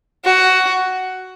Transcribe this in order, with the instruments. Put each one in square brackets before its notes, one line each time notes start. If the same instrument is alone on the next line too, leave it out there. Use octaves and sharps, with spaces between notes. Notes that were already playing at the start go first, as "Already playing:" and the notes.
[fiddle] F#4